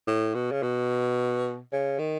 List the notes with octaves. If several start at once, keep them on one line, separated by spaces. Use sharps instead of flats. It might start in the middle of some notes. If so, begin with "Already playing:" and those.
A2
B2
C#3
B2
C#3
D#3